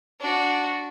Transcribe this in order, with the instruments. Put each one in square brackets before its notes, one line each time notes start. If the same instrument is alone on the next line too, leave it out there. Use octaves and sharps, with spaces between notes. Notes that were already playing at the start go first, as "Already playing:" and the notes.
[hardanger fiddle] D4 F#4